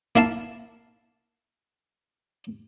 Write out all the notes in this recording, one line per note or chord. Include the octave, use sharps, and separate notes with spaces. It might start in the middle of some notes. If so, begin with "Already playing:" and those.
A#3 E4 F5 A5